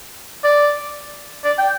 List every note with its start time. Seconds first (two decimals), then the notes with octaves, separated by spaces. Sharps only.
0.44 D5
1.44 D5
1.58 G5